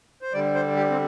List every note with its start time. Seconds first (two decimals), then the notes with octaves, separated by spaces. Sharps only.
0.22 C5
0.33 D3 G3 D5
0.55 C5
0.76 G4
0.91 C4